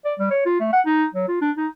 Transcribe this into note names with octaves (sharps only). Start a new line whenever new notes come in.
D5
G3
C#5
F4
A3
F#5
D#4
F#3
F4
D4
D#4